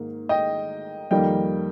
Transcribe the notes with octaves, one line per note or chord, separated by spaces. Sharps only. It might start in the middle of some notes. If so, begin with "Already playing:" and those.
Already playing: G#2 D#3 A#3
D#5 G5
F2 D#3 G3 A#3 D#5 G5